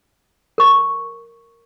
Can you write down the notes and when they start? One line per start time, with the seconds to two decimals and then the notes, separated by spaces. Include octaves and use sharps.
0.58 A#4 C#6